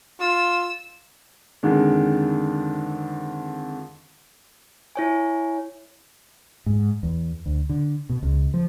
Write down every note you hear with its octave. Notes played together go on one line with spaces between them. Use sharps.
F4 E6
F2 D3 D#3 G#3
E4 C#5 G#5
G#2
E2
D2
D3
B2
C#2
F3